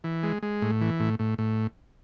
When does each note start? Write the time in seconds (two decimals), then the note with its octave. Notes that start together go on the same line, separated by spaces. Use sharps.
0.04 E3
0.23 G#3
0.42 G#3
0.62 A2
0.81 E3
1.00 A2
1.19 A2
1.38 A2